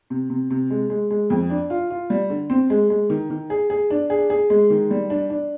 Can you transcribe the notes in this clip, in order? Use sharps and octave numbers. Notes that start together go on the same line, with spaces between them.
C3
C3
C3
G#3
G#3
G#3
F2
D4
F4
F4
G3
D3
C4
G#3
G#3
D#3
D#3
G#4
G#4
D4
G#4
G#4
G#3
D#3
G3
D4
D4